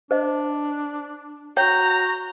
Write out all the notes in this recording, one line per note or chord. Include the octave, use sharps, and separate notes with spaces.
D4 C5 D#5
F#4 C#5 G5 A#5 G6